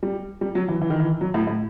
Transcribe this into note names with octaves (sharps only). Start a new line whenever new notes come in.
G3
G3
F#3
E3
E3
D#3
E3
F#3
A2
A2